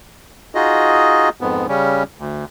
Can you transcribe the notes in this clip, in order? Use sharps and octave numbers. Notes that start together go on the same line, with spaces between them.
D#4 F4 F#4 G#4 D#5
F2 G#2 B3
C#3 G3 C#4
D2